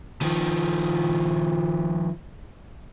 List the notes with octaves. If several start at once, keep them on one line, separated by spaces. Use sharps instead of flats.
D#3 F3